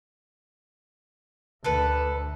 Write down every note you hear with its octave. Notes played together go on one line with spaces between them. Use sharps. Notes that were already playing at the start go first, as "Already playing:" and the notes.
D2 A4 B4